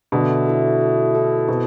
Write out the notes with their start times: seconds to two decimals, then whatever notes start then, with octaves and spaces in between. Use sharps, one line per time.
0.12 B2 D3 A3
0.47 E4 A4
0.81 A3
1.15 E4 A4
1.48 B2 C4